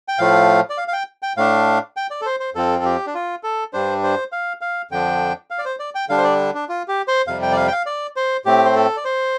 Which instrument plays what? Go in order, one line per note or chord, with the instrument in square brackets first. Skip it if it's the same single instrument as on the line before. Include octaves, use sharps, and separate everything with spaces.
[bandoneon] G5
A2 F3 A3 F5
D5
F5
F5
G5
G5
A2 A3 D4 F5
G5
D5
A4
C5
C5
F2 F3 C4 A4
A4
G4
D4
F4
A4
G2 G3 D4 C5
C5
F5
F5
F2 D3 F3 D4 G5
F5
D5
C5
D5
G5
D3 G3 D4 F5
C5
D5
D4
F4
G4
C5
F2 C3 G3 F5
G5
D5
F5
G5
F5
D5
C5
A2 A3 C4 G4
C5
A4
D5
C5